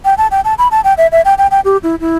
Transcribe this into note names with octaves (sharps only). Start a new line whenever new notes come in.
G5
A5
G5
A5
B5
A5
G5
E5
E5
G5
G5
G5
G4
E4
E4